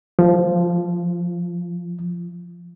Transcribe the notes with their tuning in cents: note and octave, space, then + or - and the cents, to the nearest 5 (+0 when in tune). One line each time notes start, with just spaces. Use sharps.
F3 -5 F4 -30